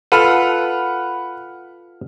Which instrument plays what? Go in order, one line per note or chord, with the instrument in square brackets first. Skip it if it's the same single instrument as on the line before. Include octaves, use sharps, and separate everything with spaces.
[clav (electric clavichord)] F4 A4 B4 [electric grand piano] F#5 B5 F6